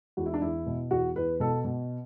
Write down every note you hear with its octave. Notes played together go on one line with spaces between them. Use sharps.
E2 F#4
E4
D4
E2 E4
B2
E2 F#4
E2 B4
B2 A4
B2